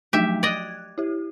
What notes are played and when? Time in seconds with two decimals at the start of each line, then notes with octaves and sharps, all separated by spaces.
0.13 F3 F#3 A3 G4 E5
0.43 D5 D#5 F#6 G#6
0.98 E4 G4